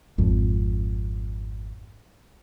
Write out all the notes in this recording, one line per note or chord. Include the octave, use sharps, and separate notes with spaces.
G#1 F2